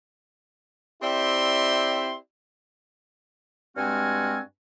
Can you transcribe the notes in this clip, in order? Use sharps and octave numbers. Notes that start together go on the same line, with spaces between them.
C4 E4 G4 D5 E5 C6
G2 G#3 C4 F#4 G#5 F6